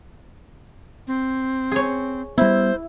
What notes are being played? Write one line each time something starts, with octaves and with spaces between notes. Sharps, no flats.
C4
G#4 C#5
G3 B3 E4 C5